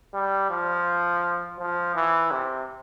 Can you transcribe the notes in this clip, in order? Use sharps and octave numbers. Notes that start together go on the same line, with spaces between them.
G3
F3
F3
E3
C3